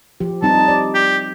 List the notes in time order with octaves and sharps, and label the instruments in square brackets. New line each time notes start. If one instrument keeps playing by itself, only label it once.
[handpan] F3 G4
[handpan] G3 C4 D#4 [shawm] A5
[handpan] D5
[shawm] G4